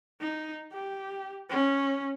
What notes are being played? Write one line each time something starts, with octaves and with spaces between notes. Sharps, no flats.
D#4
G4
C#4